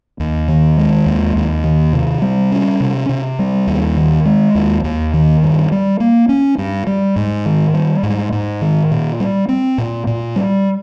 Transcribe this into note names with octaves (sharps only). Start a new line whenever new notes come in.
D#2
D#3
G#3
D#2
D#2
D#3
C3
G3
C#4
C3
C3
G3
D#2
D#3
G#3
D#2
D#2
D#3
G2
G3
A#3
C#4
G2
G3
G#2
D#3
G3
G#2
G#2
D#3
A#2
G3
C4
A#2
A#2
G3